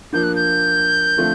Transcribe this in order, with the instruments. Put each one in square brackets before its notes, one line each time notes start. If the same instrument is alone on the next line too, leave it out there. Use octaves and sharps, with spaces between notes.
[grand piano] F3 A#3 D4 [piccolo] G6
[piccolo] F#6
G6
[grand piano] D3 F3 A3 C4 F4